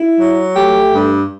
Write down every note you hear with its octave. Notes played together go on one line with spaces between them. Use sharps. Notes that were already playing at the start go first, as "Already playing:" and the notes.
Already playing: E4
F#3
A3 G4
G2